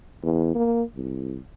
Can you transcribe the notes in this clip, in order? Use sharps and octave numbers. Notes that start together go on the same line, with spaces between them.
E2
A#3
C2